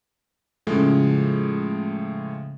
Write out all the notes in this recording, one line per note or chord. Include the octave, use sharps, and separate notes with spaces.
A2 C#3 F3 G#3 A3